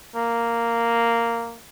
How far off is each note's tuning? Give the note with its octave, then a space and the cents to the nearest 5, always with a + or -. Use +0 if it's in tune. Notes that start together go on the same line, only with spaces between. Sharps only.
A#3 -5